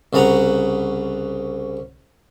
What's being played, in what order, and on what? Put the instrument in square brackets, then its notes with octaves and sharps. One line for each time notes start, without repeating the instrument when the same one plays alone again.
[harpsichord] C2 C#3 B4 F#5 A#5